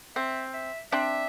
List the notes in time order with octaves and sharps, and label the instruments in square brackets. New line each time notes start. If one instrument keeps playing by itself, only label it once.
[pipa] C4 [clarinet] E5
[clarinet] E5
[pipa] C4 D4 [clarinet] E5